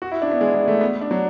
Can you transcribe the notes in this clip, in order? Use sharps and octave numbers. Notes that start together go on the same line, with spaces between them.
F#4
E4
D4
B3
G#3
G#3
A3
B3
D4
F#3